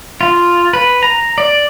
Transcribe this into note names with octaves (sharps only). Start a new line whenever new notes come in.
F4
B4
A#5
D5